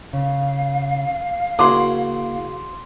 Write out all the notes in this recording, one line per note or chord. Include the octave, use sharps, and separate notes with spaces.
C#3 F5
C#3 A#3 C#4 E4 F#4 C6 D6